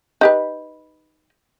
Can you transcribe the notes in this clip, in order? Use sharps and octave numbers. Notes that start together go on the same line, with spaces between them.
D#4 G4 B4